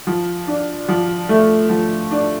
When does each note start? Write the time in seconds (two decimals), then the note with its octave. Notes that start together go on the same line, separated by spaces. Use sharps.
0.07 F3
0.47 D4
0.88 F3
1.29 A3
1.69 F3
2.11 D4